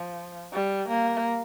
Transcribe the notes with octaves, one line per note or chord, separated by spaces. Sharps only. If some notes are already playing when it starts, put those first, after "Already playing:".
Already playing: F3
G3
A#3